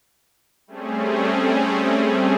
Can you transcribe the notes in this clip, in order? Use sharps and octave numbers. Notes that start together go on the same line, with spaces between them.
G3 A3 C4 C#4 G#4